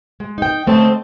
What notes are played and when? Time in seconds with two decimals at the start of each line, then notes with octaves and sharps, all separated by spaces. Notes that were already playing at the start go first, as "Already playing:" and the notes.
0.20 G#3
0.38 D#4 G5
0.67 D3 A3 C4 C#4 D#5 A5